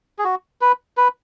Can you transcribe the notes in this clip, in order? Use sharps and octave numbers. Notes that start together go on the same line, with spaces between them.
G#4
F#4
B4
B4